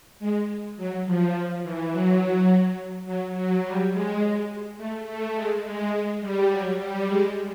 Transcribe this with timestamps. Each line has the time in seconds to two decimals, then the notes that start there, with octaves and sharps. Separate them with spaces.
0.19 G#3
0.77 F#3
1.05 F3
1.63 E3
1.91 F#3
3.06 F#3
3.34 F#3
3.63 G3
3.92 G#3
4.77 A3
5.06 A3
5.35 G#3
5.64 G#3
6.20 G3
6.50 F#3
6.78 G3
7.07 G#3